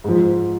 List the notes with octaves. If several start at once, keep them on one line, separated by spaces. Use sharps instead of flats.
G#2 F3